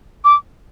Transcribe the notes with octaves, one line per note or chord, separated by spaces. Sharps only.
D6